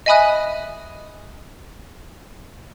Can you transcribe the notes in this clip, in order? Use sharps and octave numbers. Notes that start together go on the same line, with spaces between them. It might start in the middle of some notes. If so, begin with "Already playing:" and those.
D#5 E5 G#5 B5 D#6 F#6